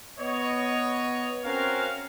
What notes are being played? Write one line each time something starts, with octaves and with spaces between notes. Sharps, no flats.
B3 C#5 D#5
C4 C#4 F#4 A#4 C#5 F5